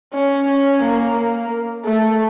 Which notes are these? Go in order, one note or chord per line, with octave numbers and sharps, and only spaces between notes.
C#4
C#4
A#3
A#3
A3